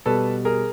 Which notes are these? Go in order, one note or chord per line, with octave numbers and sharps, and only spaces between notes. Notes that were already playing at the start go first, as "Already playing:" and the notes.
B2 G3 A4 B4
G#4 A#4